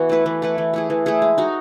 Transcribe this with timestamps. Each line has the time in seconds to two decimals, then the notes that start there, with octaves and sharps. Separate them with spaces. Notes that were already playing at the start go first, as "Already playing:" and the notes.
Already playing: E3 B3 F#4
0.09 A3 E4 B4
0.26 E3
0.42 A3 E4 B4
0.58 E3
0.74 A3 E4 G#4
0.90 E3
1.06 A3 E4 G#4
1.22 G#3
1.38 D#4 F#4